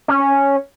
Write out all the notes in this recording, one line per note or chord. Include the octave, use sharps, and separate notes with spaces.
C#4